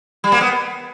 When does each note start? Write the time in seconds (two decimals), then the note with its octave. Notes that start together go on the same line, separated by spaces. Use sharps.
0.24 G3
0.32 A#3
0.41 B3